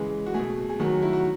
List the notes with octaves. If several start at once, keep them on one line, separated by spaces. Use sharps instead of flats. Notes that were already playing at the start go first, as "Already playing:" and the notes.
Already playing: C#3 E3 G#3 G#4
F#4
B2 A3 G#4
G#4
D#3 F#3 A3 F#4
E4
F#4